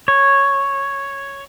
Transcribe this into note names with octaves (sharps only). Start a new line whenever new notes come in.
C#5